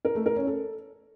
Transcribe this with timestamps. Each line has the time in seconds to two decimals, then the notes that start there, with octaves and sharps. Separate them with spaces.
0.05 A#4
0.15 A3
0.26 A#4
0.36 C#4
0.47 A4